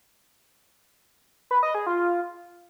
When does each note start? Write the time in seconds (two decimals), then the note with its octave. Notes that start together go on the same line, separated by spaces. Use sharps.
1.51 B4
1.63 D#5
1.75 G#4
1.86 F4